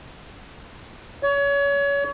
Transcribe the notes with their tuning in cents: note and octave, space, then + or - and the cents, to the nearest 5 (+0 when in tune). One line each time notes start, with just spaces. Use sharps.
C#5 +30